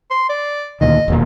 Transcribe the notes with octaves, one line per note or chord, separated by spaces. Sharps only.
C6
D5
D2 A#2 D#3 D#5
E1 D#2 A#2